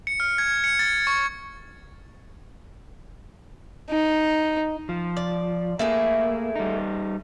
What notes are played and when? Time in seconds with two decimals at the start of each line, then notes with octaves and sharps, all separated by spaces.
0.07 C#7
0.20 F6
0.38 G#6
0.64 C#7
0.79 A6
1.07 C#6
3.90 D#4
4.89 F3
5.17 D5
5.79 A3 A#3 E4 G#4
6.56 G3 D#4